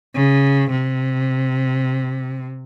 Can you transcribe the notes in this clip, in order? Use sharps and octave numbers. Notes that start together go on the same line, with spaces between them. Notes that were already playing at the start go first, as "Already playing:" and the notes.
C#3
C3